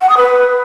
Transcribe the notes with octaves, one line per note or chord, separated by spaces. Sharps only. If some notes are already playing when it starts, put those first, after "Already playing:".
F#5
D#6
B4